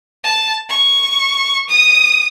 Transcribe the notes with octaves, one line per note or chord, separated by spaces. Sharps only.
A5
C#6
D#6